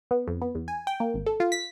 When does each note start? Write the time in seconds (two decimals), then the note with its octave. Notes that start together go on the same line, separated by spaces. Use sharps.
0.11 B3
0.28 F2
0.42 B3
0.55 E2
0.68 G#5
0.87 G5
1.00 A#3
1.14 G#1
1.26 A4
1.40 F4
1.52 B6